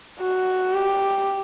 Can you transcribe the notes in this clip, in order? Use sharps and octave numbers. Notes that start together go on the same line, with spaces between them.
F#4
G4